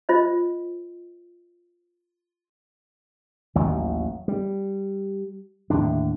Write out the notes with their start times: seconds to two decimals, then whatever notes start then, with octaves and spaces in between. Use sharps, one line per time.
0.09 F4 C5 D#5
3.55 A1 D#2 D#3 F#3
4.28 G3
5.70 D#2 A2 D3 D4